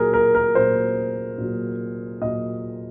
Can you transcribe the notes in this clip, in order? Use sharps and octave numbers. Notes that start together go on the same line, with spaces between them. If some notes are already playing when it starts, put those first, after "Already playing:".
Already playing: A#2 F#3 G#4 A#4
A#4
A#4
A#2 F#3 C5
A#2 F#3
A#2 F#3 D#5